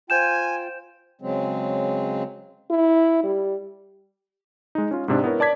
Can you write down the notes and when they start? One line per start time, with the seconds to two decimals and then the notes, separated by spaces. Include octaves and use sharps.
0.10 F4 C5 G5 G#5 G6 E7
1.22 C#3 F#3 G#3 C4
2.70 E4
3.23 G3
4.75 G#3 D#4
4.91 C#4 F4
5.08 G#2 C3 D4
5.24 B3 E4 A#4 C#5
5.40 D5 A5 D6 G#6 B6